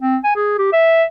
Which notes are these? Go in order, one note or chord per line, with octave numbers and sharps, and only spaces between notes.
C4
G#5
G#4
G4
E5